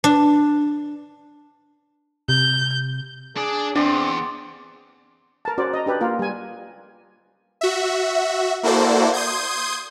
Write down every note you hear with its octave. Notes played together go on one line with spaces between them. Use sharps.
D4
C3 G6
D4 G#4 D5
E2 C4 D4 D5 C6
A#4 A5
C#4 F#4 C5 D5
D#5 A#5
D4 G4 B4 D5
A#3 F4 A#4
G3 G#5
F#4 E5
A#3 E4 F#4 A4 C5 D5
C6 D#6 G6 G#6